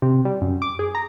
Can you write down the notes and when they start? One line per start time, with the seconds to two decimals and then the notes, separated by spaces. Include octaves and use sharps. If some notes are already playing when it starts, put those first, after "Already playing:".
0.02 C3
0.25 G3
0.41 F#2
0.62 D6
0.79 G#4
0.95 A#5